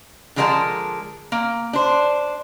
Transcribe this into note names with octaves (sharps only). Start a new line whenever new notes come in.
D3 F3 G#3 A#4 B4 A5
A#3
D4 C5